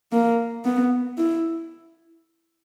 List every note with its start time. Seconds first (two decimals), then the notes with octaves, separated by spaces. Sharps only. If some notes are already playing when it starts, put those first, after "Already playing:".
0.12 A#3
0.65 B3
1.17 E4